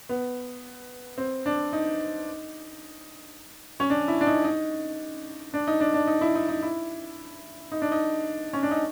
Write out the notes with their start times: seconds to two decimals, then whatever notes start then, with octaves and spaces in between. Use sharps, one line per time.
0.09 B3
1.18 C4
1.46 D4
1.73 D#4
3.80 C#4
3.90 D4
4.08 E4
4.21 D4
4.27 D#4
4.44 D#4
5.54 D4
5.67 D#4
5.80 D4
5.94 D4
6.07 D#4
6.21 E4
6.35 D#4
6.49 D#4
6.63 E4
7.72 D#4
7.82 D4
7.92 D#4
8.53 C#4
8.63 D4
8.71 D#4